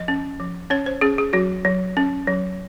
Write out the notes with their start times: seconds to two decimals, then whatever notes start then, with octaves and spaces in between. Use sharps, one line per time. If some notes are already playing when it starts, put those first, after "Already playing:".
Already playing: F3 D#5
0.08 C#4
0.40 F3
0.70 C#4 C#5
0.86 C5
1.01 C#4 G#4
1.18 G#4
1.33 F#3 F#4
1.65 F#3
1.97 C#4
2.27 F#3